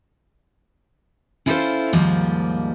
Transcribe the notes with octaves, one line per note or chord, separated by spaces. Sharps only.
C#4 E4 F4 G#4 A4 C5
D#2 G#2 F3 G3 A#3